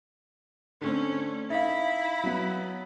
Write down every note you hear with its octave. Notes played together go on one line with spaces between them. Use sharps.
D3 A3 C4 C#4
D#4 E4 E5 F5 B5
F#3 B3